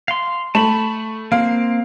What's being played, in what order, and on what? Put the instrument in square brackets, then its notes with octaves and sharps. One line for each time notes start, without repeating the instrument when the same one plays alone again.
[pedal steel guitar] F5 C6
[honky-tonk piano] A3 [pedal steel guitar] A5 B5
[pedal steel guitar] A#3 C4 [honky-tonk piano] F5